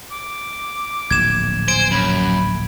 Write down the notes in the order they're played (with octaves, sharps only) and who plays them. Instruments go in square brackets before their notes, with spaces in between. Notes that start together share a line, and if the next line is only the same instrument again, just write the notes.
[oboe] D6
[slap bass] D1 A#1 [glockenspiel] G#6 E7
[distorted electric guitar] C5 [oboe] G#5 [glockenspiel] D7
[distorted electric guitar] F#2 [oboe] B5